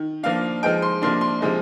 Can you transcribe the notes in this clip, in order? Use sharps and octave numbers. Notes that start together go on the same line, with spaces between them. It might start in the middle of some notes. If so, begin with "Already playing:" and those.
Already playing: D#3
F3 A#3 D4 F5
F3 G#3 D#4 G5
C6
C3 F3 A#3 D4 C6
C6
C3 F3 G#3 D#4